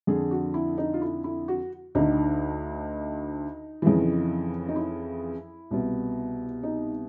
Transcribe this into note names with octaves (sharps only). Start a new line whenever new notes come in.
F2 D3 G#4
F#4
E4
D#4
F4
E4
E4
F#4
D2 D3 D#4
F2 C#3 E3
D#4
E4
C2 B2
D#4